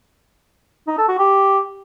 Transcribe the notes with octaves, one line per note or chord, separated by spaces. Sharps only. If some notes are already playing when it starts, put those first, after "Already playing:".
D#4
A4
F#4
G4